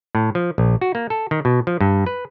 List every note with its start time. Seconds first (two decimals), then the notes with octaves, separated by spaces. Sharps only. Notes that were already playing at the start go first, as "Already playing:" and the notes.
0.15 A2
0.35 F3
0.58 A#1
0.81 F#4
0.95 A#3
1.10 A4
1.31 D#3
1.45 B2
1.67 F3
1.81 G2
2.06 B4